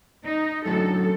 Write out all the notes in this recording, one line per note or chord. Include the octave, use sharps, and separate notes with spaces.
D#4
F#2 A2 D3 A4